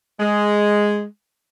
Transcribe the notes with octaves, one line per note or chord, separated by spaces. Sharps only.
G#3